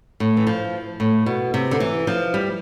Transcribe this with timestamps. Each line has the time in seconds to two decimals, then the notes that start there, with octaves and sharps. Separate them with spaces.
0.20 A2
0.37 E3
0.47 F3
1.00 A2
1.26 B2
1.54 C3
1.71 D3
1.80 E3
2.07 F3
2.34 G3